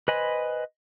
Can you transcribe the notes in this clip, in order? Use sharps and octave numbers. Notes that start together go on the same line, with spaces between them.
B4 C5 D#5 G#5 B5